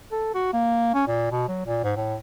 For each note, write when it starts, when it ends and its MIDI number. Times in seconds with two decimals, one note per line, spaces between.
0.12 0.32 69
0.34 0.51 66
0.53 0.94 58
0.94 1.04 61
1.07 1.30 46
1.31 1.48 47
1.48 1.63 54
1.66 1.83 46
1.84 1.92 44
1.96 2.17 45